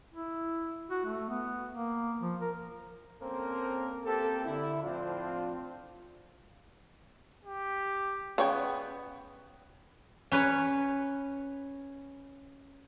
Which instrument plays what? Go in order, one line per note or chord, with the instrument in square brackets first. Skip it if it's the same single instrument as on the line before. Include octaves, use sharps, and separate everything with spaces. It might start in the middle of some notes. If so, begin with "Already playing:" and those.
[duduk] E4
F#4
A3
B3
A#3
F3
A#4
[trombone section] A#3 C4 C#4 A4 A#4 C5
A#3 C4 G4 A4
D3 E4
A2 F3 C4 D4 F4
[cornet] G4
[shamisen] C#3 C#5 G5 [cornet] B3
[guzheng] C#4 B4 C#5